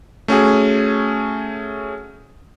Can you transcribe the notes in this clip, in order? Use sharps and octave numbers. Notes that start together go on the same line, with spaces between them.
A3 C#4 F#4 G#4